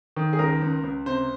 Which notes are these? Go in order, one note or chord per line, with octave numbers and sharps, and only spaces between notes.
D#3
G#4
C#2 A#4
C#2
C#2
C3 C5